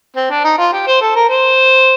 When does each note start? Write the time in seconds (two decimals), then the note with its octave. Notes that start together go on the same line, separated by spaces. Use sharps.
0.16 C4
0.30 D4
0.44 D#4
0.58 F4
0.73 G4
0.87 C5
1.01 A4
1.15 A#4
1.29 C5